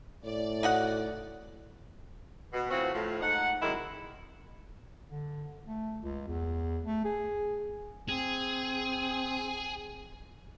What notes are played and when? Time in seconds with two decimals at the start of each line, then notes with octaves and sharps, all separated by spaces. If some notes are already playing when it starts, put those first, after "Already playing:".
0.25 A2 D5
0.63 D#4 F#4 F#5
2.53 B2
2.71 A2 E3 C4 F4 F#4
2.94 A2 F3
3.22 G#2 A3 D#4 F#5
3.62 F#2 C3 D#3 F#3 G#3 E4
5.09 D3
5.67 A3
6.02 C#2
6.28 E2
6.85 A3
7.05 G#4
8.09 C4 G#4